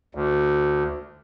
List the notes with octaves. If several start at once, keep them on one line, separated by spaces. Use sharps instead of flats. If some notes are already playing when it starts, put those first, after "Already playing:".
D2